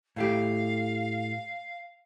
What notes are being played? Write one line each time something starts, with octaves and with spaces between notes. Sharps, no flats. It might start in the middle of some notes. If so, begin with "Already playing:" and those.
A2 A3 G4 F5